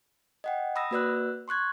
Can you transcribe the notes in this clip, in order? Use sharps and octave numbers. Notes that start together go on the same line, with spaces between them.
D#5 F#5 G5
B5 D#6 E6 A#6
A#3 F#4 B4 D5 E6 F#6
C6 C#6 F#6 G#6